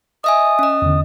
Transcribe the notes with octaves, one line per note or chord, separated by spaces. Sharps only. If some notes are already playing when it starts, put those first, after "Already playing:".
D#5 E5 G#5 D#6
C#4 D#5
E2 D3